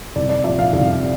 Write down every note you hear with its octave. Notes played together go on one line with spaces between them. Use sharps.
C2 D5
D5
A#2 F3 E5
F5
C2